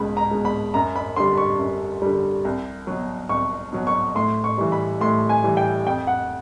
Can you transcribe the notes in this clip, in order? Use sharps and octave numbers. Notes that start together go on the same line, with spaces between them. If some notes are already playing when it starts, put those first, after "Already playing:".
Already playing: C#2 B2 G#3 B5
A#5
B2 G#3
B5
F#2 A#5
B5
D3 G3 C6
C#6
F#2
D3 G3
C2
B2 F#3
C2 C#6
B2 F#3
C#6
A2 C6
C#6
E3 G3
B5
A2 C6
G#5
E3 G3
G5
F2 G5
F#5